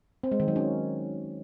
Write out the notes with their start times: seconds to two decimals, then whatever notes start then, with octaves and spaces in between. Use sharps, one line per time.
0.23 C4
0.32 G#3
0.40 D#3
0.48 F#3
0.56 C#4